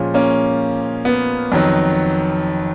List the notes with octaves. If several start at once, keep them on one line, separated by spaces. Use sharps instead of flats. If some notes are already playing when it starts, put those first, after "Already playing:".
Already playing: A#2 F3 G#3 C#4 F4
A#3 C#4
B3
F2 D#3 F#3